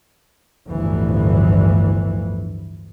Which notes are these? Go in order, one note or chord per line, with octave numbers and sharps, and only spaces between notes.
G1 D2 A2 E3 F3